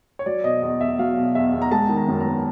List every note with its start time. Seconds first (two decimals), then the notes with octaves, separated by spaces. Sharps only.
0.19 C#5
0.26 F#3 D5
0.44 B2 D#5
0.62 E2 D#5
0.80 E2 E5
0.99 F#3 F5
1.17 B2
1.35 E2 E5
1.53 E2
1.62 A#5
1.71 G#3 A5
1.89 D#3
1.96 A#5
2.08 F#2
2.20 A#5
2.26 B3